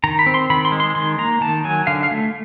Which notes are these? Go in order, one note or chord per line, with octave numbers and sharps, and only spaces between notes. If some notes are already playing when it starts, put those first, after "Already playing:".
D#3 A#5
B5
C4
C6
D#3 B5
C6
G#3
C6
D#3 C6
A#3 A#5
D#3 A5
F#3 G#5
D3 F5
F5
A3